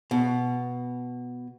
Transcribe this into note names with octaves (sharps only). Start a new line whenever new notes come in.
B2